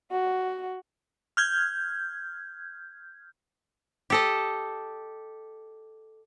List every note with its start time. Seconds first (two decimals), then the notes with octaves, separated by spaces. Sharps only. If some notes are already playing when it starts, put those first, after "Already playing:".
0.12 F#4
1.37 F6 G6 G#6
4.10 G4 A4 D#5